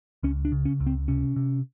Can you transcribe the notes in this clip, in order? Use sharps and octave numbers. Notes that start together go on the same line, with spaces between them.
C#2 C#4
D4
C#3
C#4
C#2
C4
C3 C#4
C3